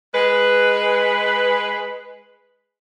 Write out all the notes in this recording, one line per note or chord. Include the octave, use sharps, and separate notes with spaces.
G#3 B4